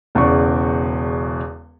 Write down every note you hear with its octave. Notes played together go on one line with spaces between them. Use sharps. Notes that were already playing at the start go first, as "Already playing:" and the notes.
E1 E2 C#3 E3 D5 C#6